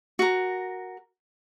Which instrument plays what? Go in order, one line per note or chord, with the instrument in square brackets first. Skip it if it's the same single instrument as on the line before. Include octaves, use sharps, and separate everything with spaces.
[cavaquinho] F#4 A#4